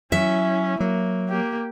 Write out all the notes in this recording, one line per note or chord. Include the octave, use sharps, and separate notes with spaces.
F#3 C#4 E4 E5
F#3 A#3
A#3 G4